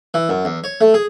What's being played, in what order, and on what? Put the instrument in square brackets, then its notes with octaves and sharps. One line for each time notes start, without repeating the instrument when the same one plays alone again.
[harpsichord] E3
F#2
E2
C#5
A3
G#4